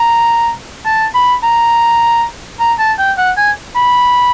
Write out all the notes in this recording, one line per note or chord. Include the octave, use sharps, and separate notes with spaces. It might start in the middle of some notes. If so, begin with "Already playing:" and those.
Already playing: A#5
A5
B5
A#5
A#5
A5
G5
F#5
G#5
B5